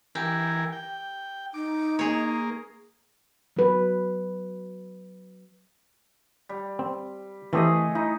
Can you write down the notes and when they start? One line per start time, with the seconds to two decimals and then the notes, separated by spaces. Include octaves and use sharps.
0.15 E3 G4 A#4 G#5
0.72 G5
1.54 D#4 D6
1.99 A#3 G#4 C#5
3.57 F#3 B4
6.49 G3
6.79 C4
7.53 E3 A3 C4 G4 G#4 D#5
7.95 D#4 E4